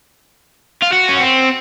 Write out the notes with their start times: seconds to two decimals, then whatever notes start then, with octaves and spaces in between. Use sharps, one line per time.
0.82 F4
0.92 F#4
1.08 C#4
1.20 C4